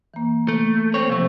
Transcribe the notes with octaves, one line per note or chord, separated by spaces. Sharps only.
E3 A#3
A3
C4 C#5
C3 F3 A3 C5